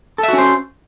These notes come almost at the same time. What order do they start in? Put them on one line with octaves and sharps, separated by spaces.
A4 E5 F#4 C#4 C5